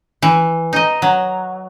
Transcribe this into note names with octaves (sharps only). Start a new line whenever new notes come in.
E3
D#4 D#5
F#3